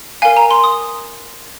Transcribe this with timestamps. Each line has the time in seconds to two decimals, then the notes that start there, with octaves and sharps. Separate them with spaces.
0.22 A#4 F5 G#5
0.37 A#5
0.51 C6
0.64 D#6